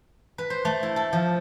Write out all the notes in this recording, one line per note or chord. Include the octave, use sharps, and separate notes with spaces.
B4
C5
A3
E4
A4
F3